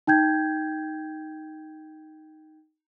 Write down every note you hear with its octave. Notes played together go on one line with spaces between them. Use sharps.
D#4 G5 G6 G#6